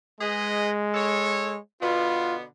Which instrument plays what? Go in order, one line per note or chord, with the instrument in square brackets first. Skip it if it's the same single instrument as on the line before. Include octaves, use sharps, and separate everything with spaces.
[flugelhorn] G#3 [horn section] G#4 B4 D#5
[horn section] A4 C#5
[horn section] B2 D3 B3 [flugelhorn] F4